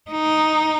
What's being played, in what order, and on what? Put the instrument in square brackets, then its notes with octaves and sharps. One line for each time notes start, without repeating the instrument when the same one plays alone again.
[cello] D#4